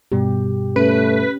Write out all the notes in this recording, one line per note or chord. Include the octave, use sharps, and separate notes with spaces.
G2 B2 G3 G4
A3 C#4 B4